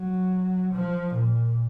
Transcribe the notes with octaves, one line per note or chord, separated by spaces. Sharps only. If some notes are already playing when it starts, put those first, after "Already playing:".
Already playing: F#3
F3
A#2